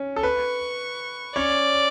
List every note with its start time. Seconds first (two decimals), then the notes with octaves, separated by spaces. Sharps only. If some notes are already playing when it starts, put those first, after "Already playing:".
Already playing: C#4
0.16 A4
0.23 B4 C#6
1.36 C#4 C#5 D5